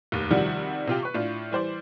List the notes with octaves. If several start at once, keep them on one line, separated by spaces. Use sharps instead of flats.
F1 D#2
C3 D#3 F3 G3 F#4
C3 F4 G4
B4 C#6
A2 D4 F4
E3 G3 C5 D5